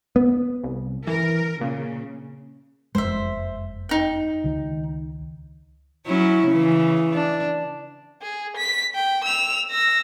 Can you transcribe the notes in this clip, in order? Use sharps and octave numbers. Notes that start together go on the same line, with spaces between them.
B3
C2
E3 A#4
A#2 C#3
F#1 F2 G#3 C5 E5
D#4 G5
C#2 D#3
F#3 C#4 E4
C#3 E3
D4
G#4
B6
G5
E6 F7
E6 A#6